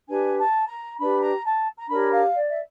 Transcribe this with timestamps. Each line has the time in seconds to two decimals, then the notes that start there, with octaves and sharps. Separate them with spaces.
0.07 D4 G4 B4 G#5
0.38 A5
0.68 A#5
0.98 D4 G4 B4 B5
1.21 A#5
1.44 A5
1.77 A#5
1.89 D4 G4 A#4 C#5 B5
2.12 F5
2.35 D5
2.50 E5